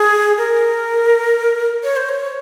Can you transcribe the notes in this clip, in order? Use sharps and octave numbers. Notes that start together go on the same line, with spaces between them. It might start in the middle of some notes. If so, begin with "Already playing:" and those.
Already playing: G#4
A#4
C#5
C5
C#5